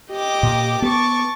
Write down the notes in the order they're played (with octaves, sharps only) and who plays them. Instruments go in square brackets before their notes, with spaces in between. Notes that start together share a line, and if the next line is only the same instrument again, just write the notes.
[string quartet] G4 D#5 D6
[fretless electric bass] A#2
[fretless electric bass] B3 [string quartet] A5 C#6 D6